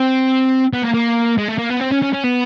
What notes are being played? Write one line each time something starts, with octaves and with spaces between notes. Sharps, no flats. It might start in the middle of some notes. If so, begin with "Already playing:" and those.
Already playing: C4
B3
A#3
A#3
G#3
A3
A#3
B3
C4
C#4
C#4
C#4
B3